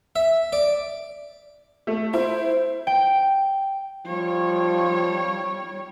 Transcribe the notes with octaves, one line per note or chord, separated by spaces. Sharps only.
E5
D5
A3
E4 C5
G5
F3 G3 C#5